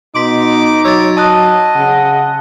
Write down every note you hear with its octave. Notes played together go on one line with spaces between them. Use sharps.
B2 D#4 C6 D6 B6
F#3 C#5 E6 A6
D#5 A5 D#6 F#6
C#3 F#5